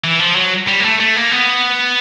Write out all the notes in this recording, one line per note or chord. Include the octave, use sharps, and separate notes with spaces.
E3
F3
F#3
G3
A#3
A3
A3
A#3
B3